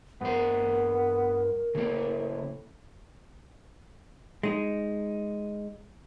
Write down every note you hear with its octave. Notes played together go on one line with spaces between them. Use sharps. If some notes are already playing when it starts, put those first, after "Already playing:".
G2 B3 A#4 C5
A2 C#3 A#3
G#3 D#4